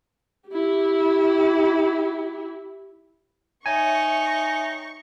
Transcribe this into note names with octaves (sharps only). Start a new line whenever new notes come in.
E4 G4
D#4 C#5 E5 G5 G#5 C#6